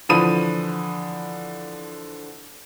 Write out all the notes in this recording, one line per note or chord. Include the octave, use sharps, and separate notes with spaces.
D3 E3 F3 B5 D#6 D#7